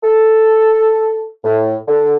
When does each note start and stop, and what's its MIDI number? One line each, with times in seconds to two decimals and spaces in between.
0.03 1.28 69
1.44 1.76 45
1.88 2.15 50